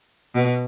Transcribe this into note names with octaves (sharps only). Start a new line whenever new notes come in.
B2